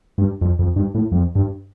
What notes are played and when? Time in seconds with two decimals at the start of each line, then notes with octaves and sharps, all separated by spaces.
0.18 G2
0.41 F2
0.59 F2
0.76 G2
0.95 A2
1.12 F2
1.35 G2